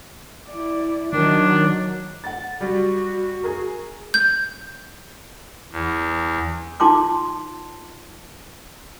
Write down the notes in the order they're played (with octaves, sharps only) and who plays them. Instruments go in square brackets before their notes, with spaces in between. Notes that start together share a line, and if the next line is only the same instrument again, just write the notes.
[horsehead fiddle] E4 D5
[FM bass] D#3 [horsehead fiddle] F#3 [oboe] D4
[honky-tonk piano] F#5 A6
[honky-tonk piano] G3 [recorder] F#4
[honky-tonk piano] G#4 A#4
[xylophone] G6
[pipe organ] E2
[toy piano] D#4 F4 A5 C6 D6